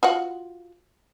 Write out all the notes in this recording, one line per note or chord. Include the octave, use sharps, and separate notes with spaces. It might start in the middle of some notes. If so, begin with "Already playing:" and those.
F4 F#4 F#5